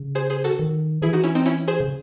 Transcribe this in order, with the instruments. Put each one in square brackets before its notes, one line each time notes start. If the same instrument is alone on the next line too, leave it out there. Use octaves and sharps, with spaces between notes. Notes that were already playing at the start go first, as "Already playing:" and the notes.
Already playing: [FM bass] C#3
[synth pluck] G#4 C5
G#4 C5
F#4 A4
[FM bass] D#3
[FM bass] E3 [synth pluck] E4 G#4
[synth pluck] D#4 F#4
C#4 E4
C4 D#4
C#4 E4
G#4 C5
[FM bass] C#3